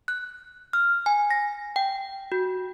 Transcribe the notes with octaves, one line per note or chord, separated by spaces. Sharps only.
F#6
F6
G#5
A#6
G5
F#4